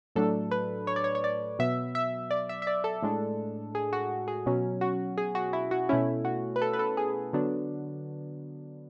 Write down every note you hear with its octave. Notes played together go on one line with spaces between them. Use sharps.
A2 F#3 A3 D4 A4
B4
C#5
D5
C#5
C#5
D5
B2 F#3 B3 E5
E5
D5
E5
E5
D5
A4
A2 G#3 D4
G#4
F#4
G#4
B2 F#3 C#4
F#4
G#4
F#4
E4
F#4
B2 A3 C#4 E4
F#4
B4
A4
B4
A4
G#4
D3 F#3 B3 D4